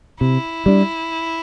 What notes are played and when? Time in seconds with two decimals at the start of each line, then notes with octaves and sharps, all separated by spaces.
0.20 C3 E4
0.66 G3 D4